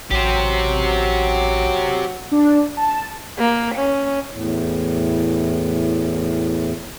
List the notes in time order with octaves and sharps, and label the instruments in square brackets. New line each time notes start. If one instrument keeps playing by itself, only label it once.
[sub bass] A1 [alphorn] F#3 [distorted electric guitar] G4 C5
[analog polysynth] D4
A5
[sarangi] A#3
C#4
[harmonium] E2 A2